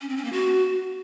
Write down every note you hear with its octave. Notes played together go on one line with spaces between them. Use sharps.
C#4
C4
C#4
A#3
F#4